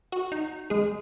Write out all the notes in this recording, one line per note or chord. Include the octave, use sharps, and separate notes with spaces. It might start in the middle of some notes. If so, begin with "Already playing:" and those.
F#4
D#4
G#3 G#4